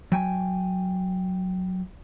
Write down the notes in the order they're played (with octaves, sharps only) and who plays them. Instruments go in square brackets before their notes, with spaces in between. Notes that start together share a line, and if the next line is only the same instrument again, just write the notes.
[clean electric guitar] F#3 G5 G#5